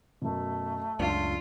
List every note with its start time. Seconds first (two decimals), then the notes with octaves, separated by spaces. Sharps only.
0.22 F#2 B2 A3
1.00 C#2 F#2 D4 F4